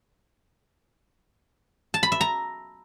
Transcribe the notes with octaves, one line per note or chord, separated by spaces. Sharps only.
A5
B5
E5
A#5